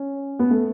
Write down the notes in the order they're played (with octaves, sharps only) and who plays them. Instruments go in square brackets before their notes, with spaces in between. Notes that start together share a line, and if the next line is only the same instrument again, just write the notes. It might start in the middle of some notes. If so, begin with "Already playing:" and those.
Already playing: [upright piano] C#4
B3
A3